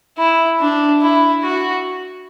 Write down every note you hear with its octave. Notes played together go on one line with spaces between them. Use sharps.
E4
D4
E4
F#4